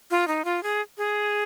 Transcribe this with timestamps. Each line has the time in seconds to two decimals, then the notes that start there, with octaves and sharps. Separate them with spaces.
0.11 F4
0.28 D#4
0.45 F4
0.63 G#4
0.98 G#4